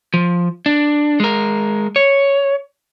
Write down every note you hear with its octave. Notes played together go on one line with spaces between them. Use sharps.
F3
D4
G#3 A#4
C#5